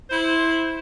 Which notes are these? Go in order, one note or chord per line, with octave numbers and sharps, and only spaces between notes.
E4 C5